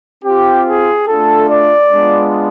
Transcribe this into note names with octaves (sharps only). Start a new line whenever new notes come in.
C4 F4 G4
G#4
A3 D4 F4 A4
D5
G#3 B3 D4 F4